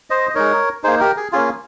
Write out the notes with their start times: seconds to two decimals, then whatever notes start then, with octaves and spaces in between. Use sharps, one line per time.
0.10 C5 D#5
0.30 D#5
0.35 G#3 D#4 A#4 C#5
0.84 A#3 D#4 G#4 C5
1.00 G4 A#4
1.17 G#4
1.32 A#3 C#4 F4 G#4